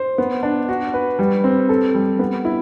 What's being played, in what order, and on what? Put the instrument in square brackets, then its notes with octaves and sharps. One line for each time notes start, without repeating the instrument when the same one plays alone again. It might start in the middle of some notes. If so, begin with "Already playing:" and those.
Already playing: [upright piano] C5
B3
D4
F#4
B4
G3
C4
A4
G3
B3
E4